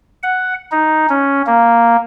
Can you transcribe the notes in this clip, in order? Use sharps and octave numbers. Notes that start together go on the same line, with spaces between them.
F#5
D#4
C#4
A#3